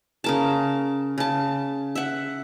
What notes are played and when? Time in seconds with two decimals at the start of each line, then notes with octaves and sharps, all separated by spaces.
0.24 C#3 A#4 A5
1.18 C#3 A5
1.95 E5 F#5